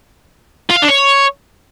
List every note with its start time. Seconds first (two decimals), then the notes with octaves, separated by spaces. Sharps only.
0.70 F4
0.76 F5
0.82 D4
0.89 C#5